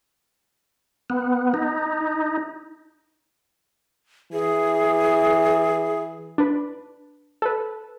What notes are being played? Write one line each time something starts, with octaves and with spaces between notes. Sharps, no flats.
B3
D#4
E3 G#4
D4 B4
A4 B4